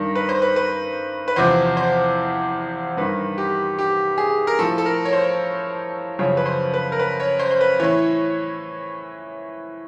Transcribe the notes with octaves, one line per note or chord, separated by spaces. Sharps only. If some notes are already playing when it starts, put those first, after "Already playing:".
Already playing: G2 D#3 A#4
B4
C5
B4
B4
B4
E2 C3 F3 C5
C5
G2 D#3 B4
G4
G4
G#4
A#4
A2 F3 A4
A4
A#4
C#5
C5
F#2 C#3 F3 C#5
B4
C5
B4
A#4
B4
C#5
C5
C5
B4
A2 E3 C#5